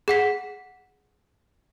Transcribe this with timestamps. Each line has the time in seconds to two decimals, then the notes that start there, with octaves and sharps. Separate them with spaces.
0.08 G#4 F#5 B6